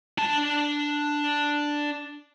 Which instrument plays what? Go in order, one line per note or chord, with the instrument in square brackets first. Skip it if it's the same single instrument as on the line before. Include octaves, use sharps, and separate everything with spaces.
[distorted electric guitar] D4 A5